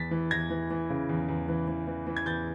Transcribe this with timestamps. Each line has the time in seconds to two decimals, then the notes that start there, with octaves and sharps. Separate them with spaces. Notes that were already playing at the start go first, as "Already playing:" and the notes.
Already playing: E2 A6 B6
0.11 E3
0.31 E2 G#6 A#6
0.50 E3
0.70 E3
0.90 C#3
1.09 E2
1.28 E2
1.48 E3
1.68 E3
1.87 E3
2.07 E3
2.16 G#6
2.26 E2 G6 A6